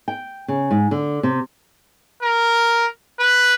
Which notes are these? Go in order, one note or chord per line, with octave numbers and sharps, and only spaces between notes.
G5
C#3
G#2
D3
C3
A#4
B4